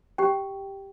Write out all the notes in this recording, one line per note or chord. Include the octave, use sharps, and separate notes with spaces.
G4 G5